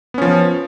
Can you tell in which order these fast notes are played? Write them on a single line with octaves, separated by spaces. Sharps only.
B3 C#4 F3